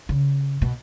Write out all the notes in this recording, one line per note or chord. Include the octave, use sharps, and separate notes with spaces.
C#3
B2